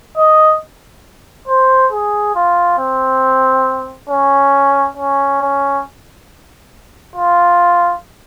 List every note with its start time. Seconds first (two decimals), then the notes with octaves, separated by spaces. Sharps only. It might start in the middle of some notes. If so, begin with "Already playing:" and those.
0.17 D#5
1.48 C5
1.92 G#4
2.35 F4
2.78 C4
4.09 C#4
4.97 C#4
5.42 C#4
7.15 F4